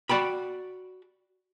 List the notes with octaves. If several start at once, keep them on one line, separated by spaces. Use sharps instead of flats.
F#4 D5 G5 B5